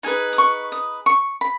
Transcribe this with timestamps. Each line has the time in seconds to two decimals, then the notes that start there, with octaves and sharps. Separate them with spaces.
0.03 D#4 G#4 B4 G#5
0.33 D#6
0.38 C#6
0.72 D#6
1.06 C#6
1.41 B5